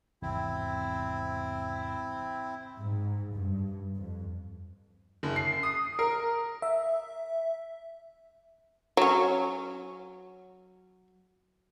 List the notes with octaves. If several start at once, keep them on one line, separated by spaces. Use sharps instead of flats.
G#1 E2 C3 C4 E4
G#2
G2
F2
F#1
C7
D#6
A#4
E5
F#3 C#4